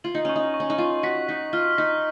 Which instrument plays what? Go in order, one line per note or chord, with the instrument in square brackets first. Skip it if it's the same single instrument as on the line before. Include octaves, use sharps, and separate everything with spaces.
[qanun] F4 [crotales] F#7
[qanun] D#4
[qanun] C#4 [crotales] C#6
[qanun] D#4
[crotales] C#6
[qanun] C#4
D#4
[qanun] F4 [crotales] C#6
[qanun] F#4 [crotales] B6
[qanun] D#4 [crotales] B6
[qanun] F4 [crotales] F6
[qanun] D#4 [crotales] B6